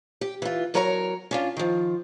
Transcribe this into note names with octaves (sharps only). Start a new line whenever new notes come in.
G4
E3 F4
E2 F#3 A#4 C#5 A5 A#5
C#4 D4 F4
D#3 F3